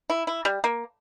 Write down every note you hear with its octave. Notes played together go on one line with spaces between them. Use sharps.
E4
E4
G3
A#3